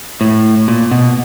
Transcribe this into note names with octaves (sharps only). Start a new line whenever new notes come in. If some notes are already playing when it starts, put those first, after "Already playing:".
A2
A#2
B2